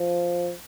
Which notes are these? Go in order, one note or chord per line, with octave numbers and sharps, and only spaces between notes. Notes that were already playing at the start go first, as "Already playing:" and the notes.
Already playing: F3